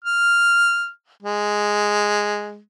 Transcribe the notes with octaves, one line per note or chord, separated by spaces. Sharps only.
F6
G#3